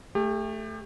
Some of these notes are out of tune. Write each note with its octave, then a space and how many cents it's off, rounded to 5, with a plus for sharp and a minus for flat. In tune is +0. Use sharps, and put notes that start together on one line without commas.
A3 +0 G4 +35